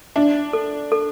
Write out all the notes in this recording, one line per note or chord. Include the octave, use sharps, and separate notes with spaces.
D4 E5
A4
A4